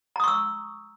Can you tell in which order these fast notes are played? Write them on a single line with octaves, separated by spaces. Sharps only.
A#5 D#6 C#6 E6